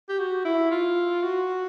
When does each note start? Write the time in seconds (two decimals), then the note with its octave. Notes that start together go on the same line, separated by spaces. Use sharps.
0.09 G4
0.19 F#4
0.45 E4
0.71 F4
1.23 F#4